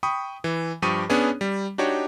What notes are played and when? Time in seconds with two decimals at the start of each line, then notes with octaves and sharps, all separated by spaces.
0.03 G5 B5 C#6 D#6
0.44 E3
0.82 G2 F3 G4 C#6 D#6 D#7
1.10 B3 C#4 D4 G#4 C#5
1.41 G3
1.78 D4 D#4 F#4 G4 C#5 C#6